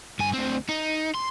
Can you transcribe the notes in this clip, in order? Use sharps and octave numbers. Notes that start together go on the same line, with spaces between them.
G2 G#5
D2 C4
D#4
C6